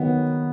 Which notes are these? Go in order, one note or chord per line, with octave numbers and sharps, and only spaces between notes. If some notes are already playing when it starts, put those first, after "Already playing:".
Already playing: D#3 F#3 B3